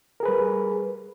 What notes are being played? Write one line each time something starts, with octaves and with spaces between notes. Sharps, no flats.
G3 G#4 A#4 B4